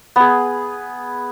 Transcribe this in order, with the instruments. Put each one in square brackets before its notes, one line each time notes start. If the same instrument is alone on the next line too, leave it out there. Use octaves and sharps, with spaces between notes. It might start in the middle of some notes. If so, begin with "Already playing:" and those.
[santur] B3 G#4